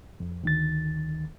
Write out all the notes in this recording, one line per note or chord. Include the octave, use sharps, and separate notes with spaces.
F2
D2 D#3 A6